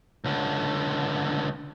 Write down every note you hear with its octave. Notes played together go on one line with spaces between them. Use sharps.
C#2 D3